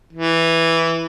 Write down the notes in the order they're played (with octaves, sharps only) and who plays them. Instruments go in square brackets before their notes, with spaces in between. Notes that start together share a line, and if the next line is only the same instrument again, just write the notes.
[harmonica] E3